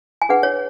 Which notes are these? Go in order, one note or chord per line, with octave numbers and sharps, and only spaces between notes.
G#5
D4 G#4 B4 F#5
C#5